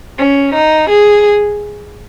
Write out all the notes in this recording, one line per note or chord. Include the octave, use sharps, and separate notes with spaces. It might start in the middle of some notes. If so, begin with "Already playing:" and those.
C#4
D#4
G#4